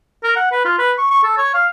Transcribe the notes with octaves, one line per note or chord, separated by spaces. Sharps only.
A#4
F#5
B4
F4
B4
C#6
C#6
A4
C#5
F5